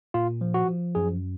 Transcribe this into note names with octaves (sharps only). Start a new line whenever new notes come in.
A#2 F4
F3
F#4
F3
F#2 G#4